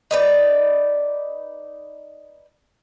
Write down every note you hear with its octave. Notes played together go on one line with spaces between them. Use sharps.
D#4 B4 D5